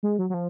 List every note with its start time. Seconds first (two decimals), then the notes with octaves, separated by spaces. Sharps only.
0.03 G#3
0.19 F#3
0.30 F#3
0.34 F3